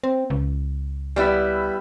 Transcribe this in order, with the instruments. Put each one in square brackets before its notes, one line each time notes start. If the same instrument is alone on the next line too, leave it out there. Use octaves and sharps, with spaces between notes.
[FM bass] C4
C#2
[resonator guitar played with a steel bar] G3 B3 E4